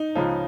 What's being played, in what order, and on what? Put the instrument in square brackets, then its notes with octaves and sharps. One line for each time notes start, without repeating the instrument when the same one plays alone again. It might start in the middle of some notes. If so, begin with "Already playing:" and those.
Already playing: [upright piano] D#4
C#2 C#3 F3